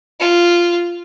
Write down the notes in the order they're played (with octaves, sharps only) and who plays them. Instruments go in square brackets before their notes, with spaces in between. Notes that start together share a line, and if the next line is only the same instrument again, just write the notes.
[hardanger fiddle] F4